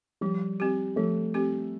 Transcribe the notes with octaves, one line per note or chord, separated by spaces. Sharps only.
F3 G3
C4 G4
F3 A3
C4 G4